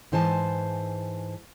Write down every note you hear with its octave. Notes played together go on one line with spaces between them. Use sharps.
G#2 E3 C5 G#5 A5